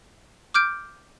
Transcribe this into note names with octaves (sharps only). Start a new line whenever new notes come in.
D6 F6 G6 D7